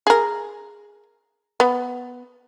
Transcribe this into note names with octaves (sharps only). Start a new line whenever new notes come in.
G#4 A#4
B3